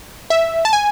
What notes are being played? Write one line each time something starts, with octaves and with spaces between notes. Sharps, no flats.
E5
A5
G#5